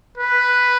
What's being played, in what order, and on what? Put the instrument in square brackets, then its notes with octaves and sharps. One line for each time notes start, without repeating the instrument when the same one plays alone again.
[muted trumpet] B4